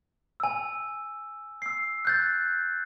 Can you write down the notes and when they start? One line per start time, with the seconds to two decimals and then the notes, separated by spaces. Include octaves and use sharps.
0.40 G#5 E6
1.62 E6 C7
2.05 F#6 G6 A6